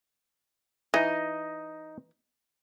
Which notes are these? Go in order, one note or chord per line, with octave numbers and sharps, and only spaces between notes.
E3 D#4 D#5